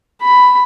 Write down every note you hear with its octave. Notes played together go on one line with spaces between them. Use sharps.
B5